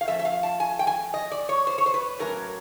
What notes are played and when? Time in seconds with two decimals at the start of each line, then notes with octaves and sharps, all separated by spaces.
0.01 F5
0.08 F3 A3 C#4 E5
0.19 E5
0.25 F5
0.43 A5
0.60 G#5
0.79 G5
0.87 G#5
1.14 D#5
1.32 D5
1.49 C#5
1.67 C5
1.78 C#5
1.86 C5
1.94 B4
2.19 A2 F#3 A#3 C#4 A#4